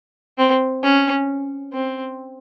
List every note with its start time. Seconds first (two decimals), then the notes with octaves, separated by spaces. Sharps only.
0.38 C4
0.83 C#4
1.73 C4